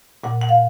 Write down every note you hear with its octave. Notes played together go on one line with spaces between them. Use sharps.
A#2 F#5
F#5
F5